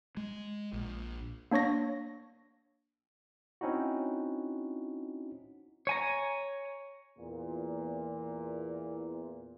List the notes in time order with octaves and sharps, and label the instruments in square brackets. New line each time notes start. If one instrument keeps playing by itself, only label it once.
[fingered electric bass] G#3
A#1
[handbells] A#3 D4 C#5 C#6 A#6
[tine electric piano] C4 C#4 D#4 E4 F#4
[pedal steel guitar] C#5 G#5 A#5
[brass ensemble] E2 A#2